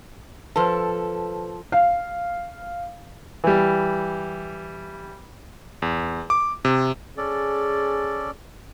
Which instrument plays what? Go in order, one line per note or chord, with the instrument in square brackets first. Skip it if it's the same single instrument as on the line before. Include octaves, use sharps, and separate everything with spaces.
[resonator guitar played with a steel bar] F3 A4 [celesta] B4 C5
[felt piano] F5
[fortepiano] E3 G3
[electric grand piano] E2
D6
C3
[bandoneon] C#4 A4 D5 [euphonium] G#4